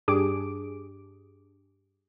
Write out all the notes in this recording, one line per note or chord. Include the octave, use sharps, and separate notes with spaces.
G2 D4 G4 G#4 D6 D7